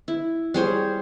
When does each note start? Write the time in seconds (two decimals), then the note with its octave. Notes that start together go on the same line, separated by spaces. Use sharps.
0.08 E4
0.54 G3 G#4 C5 C#5